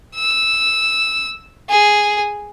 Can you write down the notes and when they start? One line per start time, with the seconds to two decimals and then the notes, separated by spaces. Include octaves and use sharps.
0.15 E6
1.69 G#4